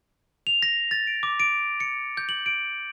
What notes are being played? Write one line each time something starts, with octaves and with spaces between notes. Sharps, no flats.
F7
A#6
A6
D7
D6
D7
C#7
G6
F#7
D7